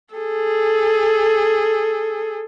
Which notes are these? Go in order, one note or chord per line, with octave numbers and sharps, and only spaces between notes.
G#4 A4